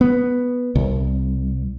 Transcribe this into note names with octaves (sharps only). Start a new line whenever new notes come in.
B3
C2